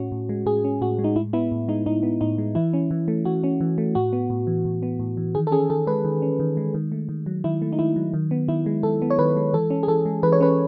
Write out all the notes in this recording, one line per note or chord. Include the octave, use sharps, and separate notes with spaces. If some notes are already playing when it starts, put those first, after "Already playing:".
Already playing: A2 C#4 F#4
A2
G#3
A2 G#4
C#4
A2 F#4
G#3
D#4
A2 E4
B3 E4
A2
G#3 D#4
A2 D#4
B3
A2 D#4
G#3
E3 E4
C#4
E3
A3
E3 F#4
C#4
E3
A3
A2 F#4
B3
A2
E3
A2
B3
A2
E3
D#3 G#4
A4
C#4 G#4
D#3 A4
G#3 B4
D#3
C#4
D#3
G#3
D#3
A3
D#3
F#3
D#3 E4
A3
D#4
D#3 E4
F#3
D#3
B3
D#3 E4
G#3
D#3 A4
B3
C#5
D#3 B4
G#3
E3 A4
C#4
G#4
E3 A4
G#3
E3 B4
C#5
C#4 B4